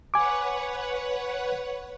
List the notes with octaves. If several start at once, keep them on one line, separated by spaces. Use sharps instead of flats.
B4 C#5 F#5 G#5 D6